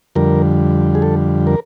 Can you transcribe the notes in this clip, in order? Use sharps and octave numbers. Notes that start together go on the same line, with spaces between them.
F2 D3 G3 A#4
G#4
A4
A#4